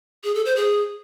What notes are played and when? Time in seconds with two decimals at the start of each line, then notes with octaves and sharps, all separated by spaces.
0.24 G#4
0.35 A4
0.46 C5
0.56 G#4